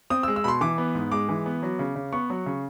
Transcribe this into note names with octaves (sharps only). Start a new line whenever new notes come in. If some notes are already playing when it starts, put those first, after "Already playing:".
C4 D#6
E6
G#3
E6
B2 B5 C6
E3 D6
B3
G#2
G#3 D6
E3
B3
F#3
C#3
C#3
B3 C#6
F#3
C#3